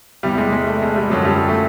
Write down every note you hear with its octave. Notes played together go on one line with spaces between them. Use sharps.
E2 C3 E3 G3
G#3
G#3
A3
G#3
G3
F#2 D3 F3 F#3
G3
A3